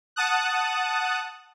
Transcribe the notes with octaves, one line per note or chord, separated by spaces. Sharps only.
F#5 A5 D#6 F#6